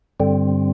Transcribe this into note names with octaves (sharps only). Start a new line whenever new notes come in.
G2 D3 G3 C4